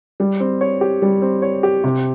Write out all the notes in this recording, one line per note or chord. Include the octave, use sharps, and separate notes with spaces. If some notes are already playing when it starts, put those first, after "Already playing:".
G3
C4
C#5
G4
G3
C4
C#5
G4
C3